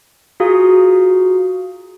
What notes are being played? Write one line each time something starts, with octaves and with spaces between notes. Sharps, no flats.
F4 F#4 G#4 F5 A#5 D#6